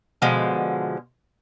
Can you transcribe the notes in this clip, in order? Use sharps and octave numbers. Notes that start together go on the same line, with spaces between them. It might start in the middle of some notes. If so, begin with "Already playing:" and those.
B2 D3 F3 G#3